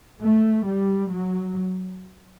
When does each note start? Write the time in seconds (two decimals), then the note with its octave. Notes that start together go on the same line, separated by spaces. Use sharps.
0.21 A3
0.66 G3
1.10 F#3